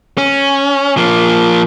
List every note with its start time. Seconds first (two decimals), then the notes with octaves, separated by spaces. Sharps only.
0.18 C#4
0.97 F3 A#3